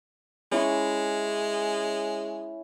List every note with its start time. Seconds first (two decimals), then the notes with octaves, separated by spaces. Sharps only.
0.52 G#3 C#4 E4 C#6